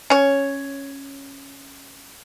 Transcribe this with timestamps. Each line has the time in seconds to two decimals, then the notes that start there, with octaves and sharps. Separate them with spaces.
0.10 C#4 C#5